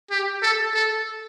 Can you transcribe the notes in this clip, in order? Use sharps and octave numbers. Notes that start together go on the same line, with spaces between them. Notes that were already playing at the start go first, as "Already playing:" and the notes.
G4
A4
A4